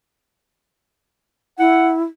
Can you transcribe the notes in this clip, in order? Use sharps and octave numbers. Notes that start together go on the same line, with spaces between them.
E4 F#5